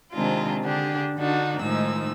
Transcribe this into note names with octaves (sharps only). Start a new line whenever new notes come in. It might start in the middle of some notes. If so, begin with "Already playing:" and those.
C3 D#3 G#3 C4 D4 F4
D3 D4 G4 G#4
D3 D4 D#4 F#4
A2 D#3 F3 G#3 D#4 E6